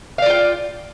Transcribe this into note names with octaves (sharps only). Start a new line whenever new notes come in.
F4 D5 F5 G5